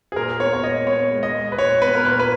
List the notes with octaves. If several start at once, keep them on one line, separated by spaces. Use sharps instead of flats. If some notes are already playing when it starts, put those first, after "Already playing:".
G#4
A#2 A#4
B3 C#5
C#5
A#2 D#5
B3 C#5
G#3
D#5
G#3
B4
A#2 C#5
B3 B4
A#4
A#2 B4
B4